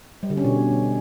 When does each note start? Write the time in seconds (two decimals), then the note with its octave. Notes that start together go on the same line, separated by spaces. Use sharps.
0.23 G3
0.30 D3
0.37 C#4
0.45 B2